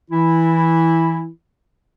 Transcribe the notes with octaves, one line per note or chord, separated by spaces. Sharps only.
E3 E4